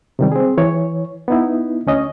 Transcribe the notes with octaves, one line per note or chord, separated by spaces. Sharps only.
C3 D#3 G3
C4 G#4
E3 C#5
B3 D#4 E4
D2 C#4 D#5